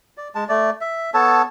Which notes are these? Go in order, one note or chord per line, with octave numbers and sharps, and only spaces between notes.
D5
G#3 A5
A3 D5
E5
B3 A4 C#5 A5